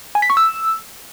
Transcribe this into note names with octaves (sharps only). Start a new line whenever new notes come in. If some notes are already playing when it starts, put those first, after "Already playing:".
G#5
B6
C#6
E6